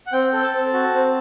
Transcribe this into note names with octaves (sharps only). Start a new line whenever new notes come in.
F#5
C4 G5
A4
A5
C4
F#4
C4